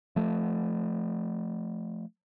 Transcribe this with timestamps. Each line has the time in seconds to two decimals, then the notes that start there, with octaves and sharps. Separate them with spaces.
0.16 F3 A3